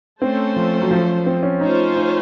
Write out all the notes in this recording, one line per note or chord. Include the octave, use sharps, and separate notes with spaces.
A3 C4 C#4 A4 C5
F3
F#3
F3
C4
C#4
A3 C#4 D#4 F4 C5
D#4